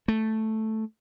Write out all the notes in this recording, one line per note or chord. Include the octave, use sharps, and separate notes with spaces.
A3